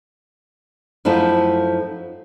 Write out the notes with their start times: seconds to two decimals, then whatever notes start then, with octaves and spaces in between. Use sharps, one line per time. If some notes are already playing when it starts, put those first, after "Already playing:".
1.05 F#2 F3 A3 D#4 E4 A4